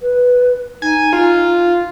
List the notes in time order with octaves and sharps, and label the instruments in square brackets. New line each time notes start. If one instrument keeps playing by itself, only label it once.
[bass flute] B4
[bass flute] D#4 [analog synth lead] G#5
[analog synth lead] F4